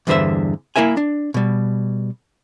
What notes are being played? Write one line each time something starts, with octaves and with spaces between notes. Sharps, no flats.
E2 G2 D3 B4 C5 E5
A#3 E4 A#4 E5 G#5
D4
B2 G3